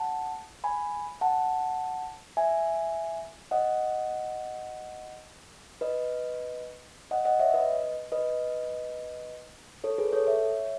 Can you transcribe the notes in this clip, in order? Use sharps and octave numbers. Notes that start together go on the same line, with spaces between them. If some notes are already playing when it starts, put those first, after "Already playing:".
Already playing: F#5 A5
G#5 B5
F#5 A5
E5 G#5
D#5 F#5
B4 D#5
D#5 F#5
D#5 F#5
C#5 E5
B4 D#5
B4 D#5
A4 C#5
G#4 B4
A4 C#5
C#5 E5